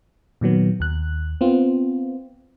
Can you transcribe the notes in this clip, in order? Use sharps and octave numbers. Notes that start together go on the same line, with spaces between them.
A#2 D#3 F#3 B3
D#2 F#6
B3 C4 F4